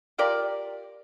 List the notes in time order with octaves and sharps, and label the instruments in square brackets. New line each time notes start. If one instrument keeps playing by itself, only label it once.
[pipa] F4 G4 A#4 D5